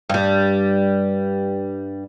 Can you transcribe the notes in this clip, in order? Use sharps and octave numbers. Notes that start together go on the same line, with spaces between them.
G2 G3